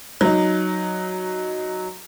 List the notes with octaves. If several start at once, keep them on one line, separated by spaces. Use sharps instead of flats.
F#3 D#4